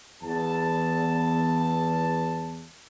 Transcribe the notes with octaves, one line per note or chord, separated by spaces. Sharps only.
E2 A5